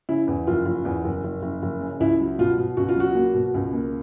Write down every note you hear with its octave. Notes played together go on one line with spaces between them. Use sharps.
C#3 E4
E2
F#1 F4
F#1
E2
F#1
F#1
F#1
F#1
C#3
C#2 E4
F#3
B2 F4
B2
C#2 F#4
F4
F#3 F#4
A#3
B2
C#2
A#3